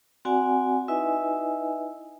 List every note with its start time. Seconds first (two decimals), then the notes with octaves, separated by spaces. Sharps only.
0.25 C4 F#4 D5 F#5 G#5
0.88 D#4 E4 B4 D#5 E5 G#5